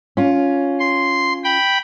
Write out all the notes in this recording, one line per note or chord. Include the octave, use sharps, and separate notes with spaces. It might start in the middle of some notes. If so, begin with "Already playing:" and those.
C#4 F4
C6
G5 B5